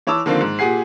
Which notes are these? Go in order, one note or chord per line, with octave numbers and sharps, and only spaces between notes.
E3 C#5 A5 D6 E6
D3 D#3 F3 A#3 C4
G#2
A#2 G4 G#4 F#5 G#5 C7